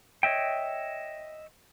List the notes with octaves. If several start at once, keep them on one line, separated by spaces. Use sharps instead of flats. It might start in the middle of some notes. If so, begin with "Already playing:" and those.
C#5 D#5 E5 G5